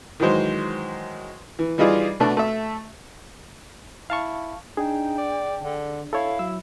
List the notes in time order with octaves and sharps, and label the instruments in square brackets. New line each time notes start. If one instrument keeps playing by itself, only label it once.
[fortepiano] D#3 E3 F#3 G#3 C5
E3
E3 G3 D#4 F4 G#4 D5
B2 A3 D4 F#4
A3 E5
[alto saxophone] E4 [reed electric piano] F5 A5 C#6
[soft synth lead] D4 [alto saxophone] D#4 [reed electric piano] G#4 [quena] G5
[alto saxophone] D5
[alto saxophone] D3 [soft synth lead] D4
[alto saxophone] E4 [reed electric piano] A4 C#5 [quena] F5
[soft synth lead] F#3 [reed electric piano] E6